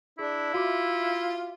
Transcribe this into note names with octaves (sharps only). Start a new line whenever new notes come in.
D4 E4 G#4
F4 F#4 E5 D6